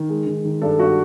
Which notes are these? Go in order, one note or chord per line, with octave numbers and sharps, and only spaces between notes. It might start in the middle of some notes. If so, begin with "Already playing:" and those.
Already playing: D#3
G#3
D#3
D#3
G2 A4
G2 F#4